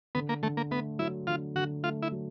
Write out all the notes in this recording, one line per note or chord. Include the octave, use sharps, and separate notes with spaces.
D3 B3
A#3
D3 A3
A#3
A3 B3
F#3 E4
D3 F4
D3 F#4
A3 F4
E4
F#3